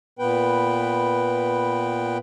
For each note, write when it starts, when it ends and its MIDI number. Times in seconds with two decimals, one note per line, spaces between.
0.19 2.18 46
0.19 2.18 59
0.19 2.18 71
0.19 2.18 79